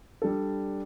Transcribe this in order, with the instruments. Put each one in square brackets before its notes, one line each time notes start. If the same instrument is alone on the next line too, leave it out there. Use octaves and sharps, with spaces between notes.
[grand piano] G3 D4 A4